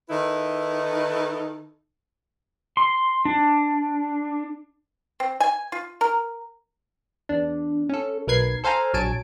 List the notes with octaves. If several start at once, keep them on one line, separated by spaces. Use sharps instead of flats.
D#3 D#4 E4 A4 B4
C6
D4
C4
G#5
F4
A#4
E2 D4
C#4 A4
B1 A#4 B4 G#6 C7
A4 C5 F5 G#5 A#5
A#1 F#3 G#5 A5 D7